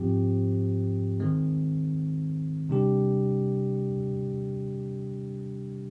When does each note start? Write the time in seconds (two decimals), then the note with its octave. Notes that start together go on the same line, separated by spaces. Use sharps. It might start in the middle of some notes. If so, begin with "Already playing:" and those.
Already playing: G#2 F3 C4 G4
1.19 D#3 G#3 C4
2.69 C3 G3 D4 G4